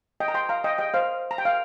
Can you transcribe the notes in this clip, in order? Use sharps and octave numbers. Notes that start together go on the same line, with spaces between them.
D#5 G5
A#5
G5 C6
F5 A#5
D#5 G5
D#5 G5
C5 F5
A#5
G5
F5